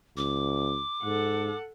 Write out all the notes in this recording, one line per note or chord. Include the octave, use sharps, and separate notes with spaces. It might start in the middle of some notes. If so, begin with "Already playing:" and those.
C#2 D6
G#2 A4 F#5